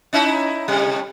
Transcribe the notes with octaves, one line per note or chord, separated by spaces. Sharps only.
C#4 D#4 E4
A2 C3 G3